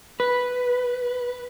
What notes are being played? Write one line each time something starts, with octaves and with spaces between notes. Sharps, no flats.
B4